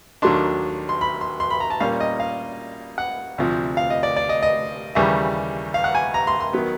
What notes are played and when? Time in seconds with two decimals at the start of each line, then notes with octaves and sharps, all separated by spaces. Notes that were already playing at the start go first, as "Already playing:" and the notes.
0.22 D#2 D#3 F#3 A3 D4 C6
0.89 C6
1.01 B5
1.21 C6
1.40 C6
1.50 B5
1.60 A#5
1.70 A5
1.80 A#2 G3 A#3 C#4 F5
2.00 D#5
2.20 F5
2.98 F#5
3.38 D2 C3 F3
3.77 F5
3.90 D#5
4.03 D5
4.16 D5
4.29 D#5
4.43 D#5
4.95 D#2 C#3 E3 G3 E5
5.74 F5
5.84 F#5
5.95 G#5
6.14 A#5
6.27 C6
6.40 C6
6.53 D#3 F#3 B3